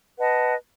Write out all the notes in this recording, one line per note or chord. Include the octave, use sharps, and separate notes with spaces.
B4 D#5 F#5 A5